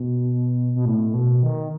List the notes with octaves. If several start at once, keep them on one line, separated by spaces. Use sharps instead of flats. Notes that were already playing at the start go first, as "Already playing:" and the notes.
Already playing: B2
B2
A2
B2
D#3